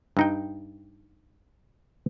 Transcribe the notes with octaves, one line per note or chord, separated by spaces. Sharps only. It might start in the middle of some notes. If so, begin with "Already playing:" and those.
G2 D#4 G5